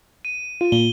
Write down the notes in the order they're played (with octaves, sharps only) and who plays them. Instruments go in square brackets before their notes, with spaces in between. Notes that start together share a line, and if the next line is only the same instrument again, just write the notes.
[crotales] D#7
[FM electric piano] F4 [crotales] D#7
[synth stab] A#2 [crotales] G7